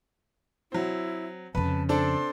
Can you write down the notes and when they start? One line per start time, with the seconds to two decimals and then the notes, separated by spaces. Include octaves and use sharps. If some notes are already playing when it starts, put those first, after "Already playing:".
0.72 F#3 C4 E4
1.55 F2 C#3 B4 A5
1.89 C4 D4 A4 C6